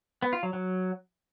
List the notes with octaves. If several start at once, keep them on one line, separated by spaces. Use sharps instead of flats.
B3
F4
F#3
F#3